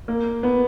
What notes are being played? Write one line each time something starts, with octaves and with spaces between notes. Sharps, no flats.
A#3
B3